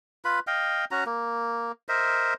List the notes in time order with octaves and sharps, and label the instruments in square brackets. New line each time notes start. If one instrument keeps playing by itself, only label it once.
[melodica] F4 B4 B5
D#5 F5 G5
C#4 F#4 A#5
A#3
A#4 C5 D#5 E5